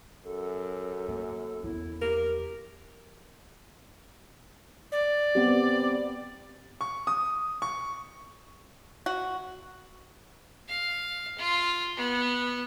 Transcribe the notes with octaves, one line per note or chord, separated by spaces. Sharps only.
F#2 A4
A#3
E2 F3 E4
G4 A#4
D5
B3 C4 G4
C#6
D#6
C#6
F#4
F5
F4
B3